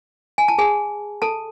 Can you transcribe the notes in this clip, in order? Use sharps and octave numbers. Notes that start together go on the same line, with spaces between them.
G#5
A5
G#4 G#5
A4 A5